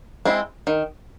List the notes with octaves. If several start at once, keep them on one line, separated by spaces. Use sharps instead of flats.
G#3 C4 E4
D#3